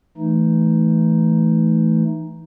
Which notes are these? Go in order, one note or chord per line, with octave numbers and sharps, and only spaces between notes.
E3 A3 D#4